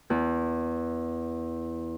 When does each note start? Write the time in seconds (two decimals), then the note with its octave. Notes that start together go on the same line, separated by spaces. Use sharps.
0.10 E2 E3